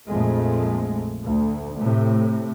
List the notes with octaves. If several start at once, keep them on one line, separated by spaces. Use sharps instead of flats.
A#1 F2 G#3 A3
D2
A2 C3